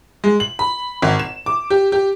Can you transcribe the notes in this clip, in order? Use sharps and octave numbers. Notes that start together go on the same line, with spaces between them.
G#3
F#7
B5
G#1
E7
D6
G4
G4